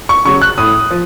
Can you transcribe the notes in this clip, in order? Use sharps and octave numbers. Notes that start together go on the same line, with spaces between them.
C#6
C#3 F#3 C#6
F#6
A2 D#6
F3